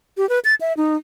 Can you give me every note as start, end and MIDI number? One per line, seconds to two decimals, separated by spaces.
0.17 0.28 67
0.29 0.39 71
0.45 0.54 93
0.61 0.73 76
0.77 0.96 63